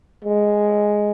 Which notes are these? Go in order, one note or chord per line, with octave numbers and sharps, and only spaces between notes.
G#3